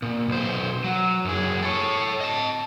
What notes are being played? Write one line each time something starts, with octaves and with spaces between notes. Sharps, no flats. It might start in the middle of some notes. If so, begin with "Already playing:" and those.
A#2
B1 C5
F#3
F#2 G#4
A4 C#5
D#5 A5